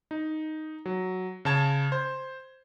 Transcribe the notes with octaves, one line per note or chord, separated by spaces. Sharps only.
D#4
F#3
C#3 A5 G#6
C5